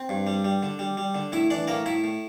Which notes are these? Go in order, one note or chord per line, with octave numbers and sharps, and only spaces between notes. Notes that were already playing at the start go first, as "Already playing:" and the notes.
Already playing: C4
G2
G3
G3
D3
G3
G3
D3
A2 E4 E5
E3 D4 D5
A2 A#3 A#4
A2 E4 E5
A2